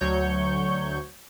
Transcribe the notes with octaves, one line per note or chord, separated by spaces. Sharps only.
D2 F#3 C#5 C#6 G6